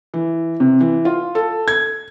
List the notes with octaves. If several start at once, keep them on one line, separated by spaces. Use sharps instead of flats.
E3
C3
E3
F4
A4
G#6